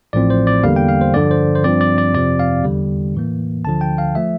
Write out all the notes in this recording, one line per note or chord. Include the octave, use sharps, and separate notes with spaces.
A1 A2 F3 C4 D5
C5
D5
E2 D3 G3 A#3 F5
G5
F5
C5
G2 D3 F3 D5
C5
C5
G2 F3 C4 D5
D5
D5
F2 C3 F3 C4 D5
F5
E2 D3 G3
A2 E3 A#3
D2 D3 F3 A5
G5
F5
F3 A3 E5